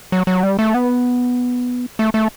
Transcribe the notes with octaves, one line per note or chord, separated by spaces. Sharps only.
F#3
F#3
G3
A3
B3
A3
A3